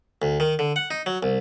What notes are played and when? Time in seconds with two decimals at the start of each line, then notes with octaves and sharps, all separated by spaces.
0.22 D2
0.40 D#3
0.59 D3
0.76 F#5
0.91 D#4
1.06 F#3
1.23 C2